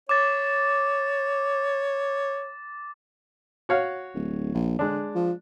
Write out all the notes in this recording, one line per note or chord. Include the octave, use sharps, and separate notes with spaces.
C#5 D6 A6
F#4 C#5 F5
D1
A#1
D3 G#3 D4
F3